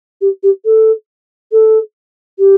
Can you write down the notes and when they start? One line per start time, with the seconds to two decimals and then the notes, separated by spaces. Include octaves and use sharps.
0.21 G4
0.43 G4
0.65 A4
1.52 A4
2.39 G4